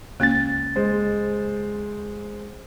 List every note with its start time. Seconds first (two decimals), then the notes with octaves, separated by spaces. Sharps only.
0.20 C#2 A#3 C#4 A6
0.76 G#3 C5